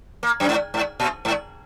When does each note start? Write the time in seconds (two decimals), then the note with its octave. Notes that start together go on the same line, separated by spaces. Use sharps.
0.23 A#3
0.40 F#2
0.49 G#2
0.74 G#2
1.00 A#2
1.25 G#2